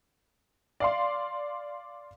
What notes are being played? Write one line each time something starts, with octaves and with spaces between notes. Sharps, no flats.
D5 F5 C6